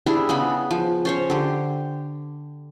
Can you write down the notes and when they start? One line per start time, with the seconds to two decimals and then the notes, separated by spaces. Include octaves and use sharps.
0.06 G3 D4 E4 G#4
0.29 C#3 G#3 B3 B5
0.71 F3
1.05 C#4 C5 C#5
1.30 D3 G4